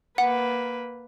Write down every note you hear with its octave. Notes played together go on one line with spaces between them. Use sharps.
A#3 B4 F#5